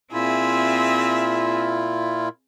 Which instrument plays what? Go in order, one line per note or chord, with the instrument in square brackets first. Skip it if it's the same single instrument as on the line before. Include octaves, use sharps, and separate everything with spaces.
[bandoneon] A#2 E4 F4 [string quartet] C4 G#4 E5